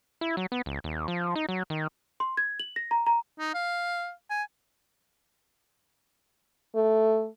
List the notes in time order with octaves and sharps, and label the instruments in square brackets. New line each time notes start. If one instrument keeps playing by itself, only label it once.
[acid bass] E4
F#3
B3
C#2
D#2
F3
D#4
F#3
D#3
[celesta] C6
G#6
F#7
A#6
A#5
A#5
[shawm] D#4
F5
G#5
[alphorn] A3